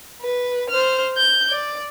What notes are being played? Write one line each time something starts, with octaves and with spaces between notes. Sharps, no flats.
B4
C5 F6
G6
D5